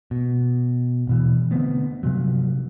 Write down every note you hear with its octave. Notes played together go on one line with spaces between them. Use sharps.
B2
D#1 B2 E3
D3 A3 B3 C4
G2 C3 F3 F#3